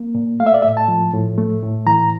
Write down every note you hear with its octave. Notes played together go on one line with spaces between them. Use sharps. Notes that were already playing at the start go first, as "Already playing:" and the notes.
Already playing: A#3
A#2
A3 F5
E5
D5
A2 E5
A5
F3
A2
A3
A2
E3 A#5